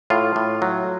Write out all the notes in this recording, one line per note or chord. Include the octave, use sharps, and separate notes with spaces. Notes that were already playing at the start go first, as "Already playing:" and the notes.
A2 F4
A2
F#3